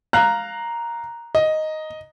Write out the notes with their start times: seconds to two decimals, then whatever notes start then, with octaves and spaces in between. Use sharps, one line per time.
0.13 F5 A#5 F#6
1.35 D#5